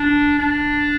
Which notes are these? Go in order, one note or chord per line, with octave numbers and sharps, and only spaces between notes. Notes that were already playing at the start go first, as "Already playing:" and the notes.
Already playing: D4
D4